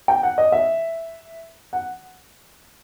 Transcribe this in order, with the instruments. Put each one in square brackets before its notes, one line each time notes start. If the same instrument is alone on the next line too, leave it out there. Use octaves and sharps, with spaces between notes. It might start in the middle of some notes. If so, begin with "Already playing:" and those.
[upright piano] G5
F#5
D#5
E5
F#5